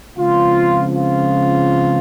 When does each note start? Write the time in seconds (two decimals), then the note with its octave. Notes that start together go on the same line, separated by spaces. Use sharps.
0.18 C#2 C#3 F3 C4 F4
0.95 F4